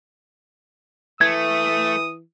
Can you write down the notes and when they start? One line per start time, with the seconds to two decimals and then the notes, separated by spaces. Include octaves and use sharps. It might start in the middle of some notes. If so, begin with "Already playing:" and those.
1.21 E3 A3 D#6 G#6